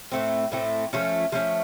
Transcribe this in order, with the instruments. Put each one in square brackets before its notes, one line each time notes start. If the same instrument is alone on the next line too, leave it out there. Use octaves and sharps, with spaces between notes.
[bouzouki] A2 A3 C4
A2 A3 C4
F3 A3 C#4
F3 A3 C#4